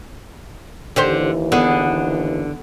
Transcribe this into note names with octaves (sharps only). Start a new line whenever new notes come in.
D#2 D3 E3 G4 C5
D3 B3 G#4